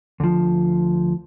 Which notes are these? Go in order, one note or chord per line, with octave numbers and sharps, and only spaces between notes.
D2 F3